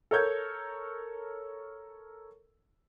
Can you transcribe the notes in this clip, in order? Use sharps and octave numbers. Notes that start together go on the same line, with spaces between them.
A4 A#4 C#5 G6 G#6